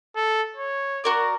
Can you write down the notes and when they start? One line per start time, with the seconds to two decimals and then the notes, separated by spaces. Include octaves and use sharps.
0.16 A4
0.56 C#5
1.04 F#4 A#4 D5